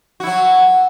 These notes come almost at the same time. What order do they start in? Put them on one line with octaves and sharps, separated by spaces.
F#4 E4 F#3